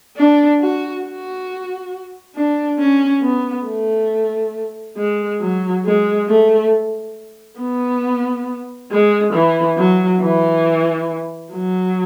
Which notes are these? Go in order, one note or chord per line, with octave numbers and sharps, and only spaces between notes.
D4
F#4
F#4
D4
C#4
B3
A3
G#3
F#3
G#3
A3
B3
G#3
E3
F#3
E3
F#3